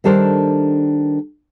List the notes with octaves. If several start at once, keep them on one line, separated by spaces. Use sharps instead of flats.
D#3 G3 D4 A4 A#4 C5